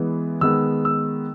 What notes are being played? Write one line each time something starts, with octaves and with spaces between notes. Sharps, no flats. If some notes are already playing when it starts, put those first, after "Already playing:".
Already playing: E3 G#3 B3
D#3 G#3 B3 E6
E6